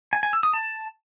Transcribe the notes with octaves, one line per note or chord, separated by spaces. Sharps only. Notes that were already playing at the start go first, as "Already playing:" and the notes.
G#5
G#5
E6
D#6
A5